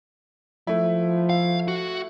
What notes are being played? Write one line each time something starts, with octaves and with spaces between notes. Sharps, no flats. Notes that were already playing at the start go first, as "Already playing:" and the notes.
F3 A3 E4
F5
F#4